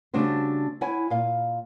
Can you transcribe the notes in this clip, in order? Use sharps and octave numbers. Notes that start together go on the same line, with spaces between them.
C#3 G3 A3 D4 F#4 C5
E4 C#5 F#5 G#5
A#2 F5